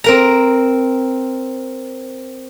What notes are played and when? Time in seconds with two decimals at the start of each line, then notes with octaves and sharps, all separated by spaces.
0.04 C4 A#4 A#5